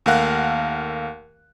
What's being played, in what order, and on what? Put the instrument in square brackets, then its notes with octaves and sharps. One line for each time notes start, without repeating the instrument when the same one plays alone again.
[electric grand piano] D#2 A3 A#4 F5 F#5 F#6